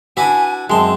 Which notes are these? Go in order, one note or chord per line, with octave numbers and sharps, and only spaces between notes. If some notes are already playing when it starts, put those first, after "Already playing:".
D4 E4 F#4 B4 E5 G#5 D6
F#2 G#3 C4 A5 C6